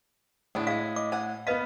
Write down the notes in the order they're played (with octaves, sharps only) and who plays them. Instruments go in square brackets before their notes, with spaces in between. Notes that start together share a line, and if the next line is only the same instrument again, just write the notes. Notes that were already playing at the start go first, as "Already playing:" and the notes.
[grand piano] A2 [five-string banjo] B3 D4 G#4
[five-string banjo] G#3 G#4 [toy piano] F5
[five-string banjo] D#5 [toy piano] D6
[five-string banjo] F#5 G#5
[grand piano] B3 D#7 [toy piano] B4 D#5 F5